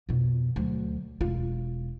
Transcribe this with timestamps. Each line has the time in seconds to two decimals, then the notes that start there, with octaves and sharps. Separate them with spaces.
0.09 F2 B2
0.56 D2 F#3
1.21 E1 F4